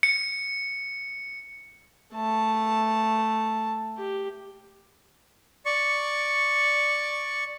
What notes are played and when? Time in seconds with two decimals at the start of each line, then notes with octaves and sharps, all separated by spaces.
0.03 C#7
2.14 A3 A5
3.98 G4
5.66 D5 C#6